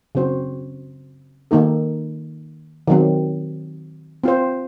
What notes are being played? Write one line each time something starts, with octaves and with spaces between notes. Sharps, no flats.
C#3 F#3 C4 F#4 C5
D#3 A#3 D#4 A4
D#3 F#3 C4
C4 F4 C5